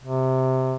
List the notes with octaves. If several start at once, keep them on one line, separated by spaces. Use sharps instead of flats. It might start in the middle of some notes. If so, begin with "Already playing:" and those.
C3